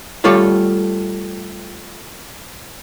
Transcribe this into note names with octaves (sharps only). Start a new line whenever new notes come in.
G3 A3 F4 A4 C#5 F5